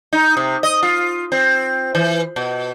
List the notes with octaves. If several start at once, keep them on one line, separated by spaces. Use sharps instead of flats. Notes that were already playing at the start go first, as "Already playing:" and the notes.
D#4
C3
D#5
F4
C4
E3
B2